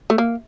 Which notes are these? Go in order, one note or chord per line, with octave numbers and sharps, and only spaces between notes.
A3
A#3